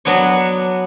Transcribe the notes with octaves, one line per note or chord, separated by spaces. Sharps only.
F#3 B3 D4 C#5